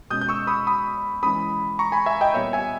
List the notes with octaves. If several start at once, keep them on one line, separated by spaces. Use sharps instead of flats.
B2 G#3 C#4 D#6 G6
G6
C#6 E6
B5 D#6
B5 D#6
E3 G#3 C#4 B5 D#6
A#5 C#6
G#5 B5
E5 G#5
D#5 G5
A#2 G3 B3 C#5 E5
E5 G#5